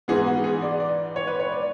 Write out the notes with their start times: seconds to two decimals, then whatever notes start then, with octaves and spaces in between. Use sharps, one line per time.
0.08 G#2 E3 B3 G#4
0.26 F#4
0.44 G#4
0.62 D5
0.80 D5
1.16 C#5
1.27 B4
1.40 C#5
1.52 D5